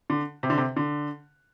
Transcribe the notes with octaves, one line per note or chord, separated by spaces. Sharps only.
D3
C3
D3
C3
D3